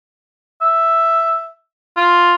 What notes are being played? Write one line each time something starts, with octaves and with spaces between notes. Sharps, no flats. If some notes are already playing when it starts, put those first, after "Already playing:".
E5
F4